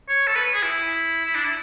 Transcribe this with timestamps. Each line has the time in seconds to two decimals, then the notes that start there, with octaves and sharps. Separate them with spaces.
0.09 C#5
0.27 A4
0.36 B4
0.54 G#4
0.63 E4
1.26 E4
1.35 D4
1.44 E4